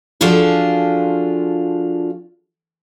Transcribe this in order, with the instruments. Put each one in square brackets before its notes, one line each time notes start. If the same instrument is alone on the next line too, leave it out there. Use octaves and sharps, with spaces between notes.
[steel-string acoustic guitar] F3 D4 F4 F#4 G#4 A4